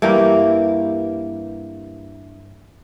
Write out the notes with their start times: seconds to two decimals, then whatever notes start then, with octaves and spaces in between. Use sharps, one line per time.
0.02 G2 E3 A#3 G4